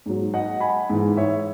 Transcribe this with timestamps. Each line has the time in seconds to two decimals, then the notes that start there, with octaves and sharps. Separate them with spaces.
0.06 G#2 F#3
0.34 D#5 F#5
0.60 G#5 B5
0.90 G#2 E3
1.17 C#5 E5